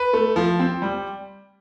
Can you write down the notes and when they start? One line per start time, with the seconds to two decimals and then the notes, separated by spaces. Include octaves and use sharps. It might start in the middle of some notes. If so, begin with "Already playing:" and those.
Already playing: B4
0.13 A3
0.36 F3
0.59 C4
0.82 G3